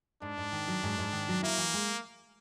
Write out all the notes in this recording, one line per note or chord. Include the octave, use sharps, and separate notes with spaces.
G#2 D4
G#2
D#3
F#3
G#2
G#2
D#3
F#3
A#3 E4
E3
G#3